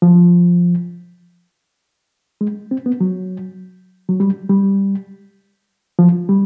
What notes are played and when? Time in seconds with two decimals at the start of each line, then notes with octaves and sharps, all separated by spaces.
0.02 F3
2.41 G#3
2.71 C4
2.86 B3
3.01 F#3
4.09 F#3
4.20 G3
4.50 G3
5.99 F3
6.29 G3